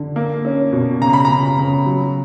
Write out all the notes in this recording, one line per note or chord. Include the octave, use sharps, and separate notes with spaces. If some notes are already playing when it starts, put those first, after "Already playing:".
Already playing: D3
A#3
C#4
B2
C#3 A#5
B5
A#5
C#3
C#3
F#3